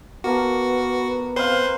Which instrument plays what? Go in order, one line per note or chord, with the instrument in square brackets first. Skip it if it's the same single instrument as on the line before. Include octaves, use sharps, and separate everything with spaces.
[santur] A#3 A#4 A5 [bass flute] B3 [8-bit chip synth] F#4
[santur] C4 F5 [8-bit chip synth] B4 C5 C6